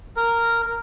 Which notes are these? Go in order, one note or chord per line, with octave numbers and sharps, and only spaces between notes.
A#4